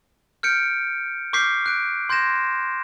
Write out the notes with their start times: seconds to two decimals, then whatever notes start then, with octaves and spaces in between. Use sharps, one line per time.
0.43 F6 G6 C#7 D7
1.33 C#6 D6 F6 G6 B6 C7
1.66 F#6 D7
2.09 C6 G6 G#6 A#6 E7